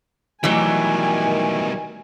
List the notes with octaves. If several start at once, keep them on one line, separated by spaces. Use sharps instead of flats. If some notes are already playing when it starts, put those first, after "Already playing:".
B2 D#3 E3 F#3 G3 A3 G#5